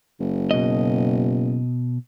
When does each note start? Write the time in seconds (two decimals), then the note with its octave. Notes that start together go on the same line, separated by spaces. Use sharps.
0.20 F#1
0.51 B2 D#5